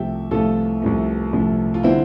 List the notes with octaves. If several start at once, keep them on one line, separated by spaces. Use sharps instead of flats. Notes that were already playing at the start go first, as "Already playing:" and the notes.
Already playing: C2 C3 F3 A3 E5 G5
C2 C3 F3 A3 F4 A4
C2 C3 F3 A3
C2 C3 F3 A3
F4
D3 G3 C4 E4